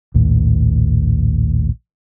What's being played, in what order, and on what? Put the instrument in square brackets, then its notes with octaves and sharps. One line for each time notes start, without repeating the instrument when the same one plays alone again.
[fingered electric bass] A#1 D#2 A2